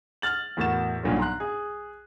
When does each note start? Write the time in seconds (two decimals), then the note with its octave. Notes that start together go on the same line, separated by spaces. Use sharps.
0.22 F6 A6 F#7
0.57 E2 A2 F#4 A#4 A6 E7
1.03 B1 G2 A#2 D3 F#3
1.19 A#5 C6 F#6
1.40 G#4